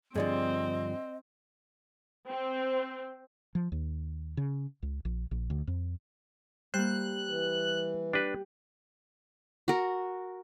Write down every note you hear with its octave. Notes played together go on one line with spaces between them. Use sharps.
G2 D3 F3 C4 G#4 D5 D#5
C4
F3
D#2
C#3
C#2
A#1
A#1
D2
F2
G3 A#3 C5 F#6
E3
D4 G4 B4
F#4 A#4